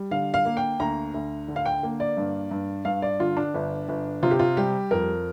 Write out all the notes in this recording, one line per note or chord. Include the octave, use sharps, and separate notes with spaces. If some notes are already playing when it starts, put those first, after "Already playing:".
Already playing: G3
D3 F5
F5
A#3
G5
D2 A#5
D2
D3
F5
G5
A#3
D5
G2
G2
G2 F5
D5
D3 F4
D4
G1
G1
C3 F4
G4
F4
G3 G4
F2 A#4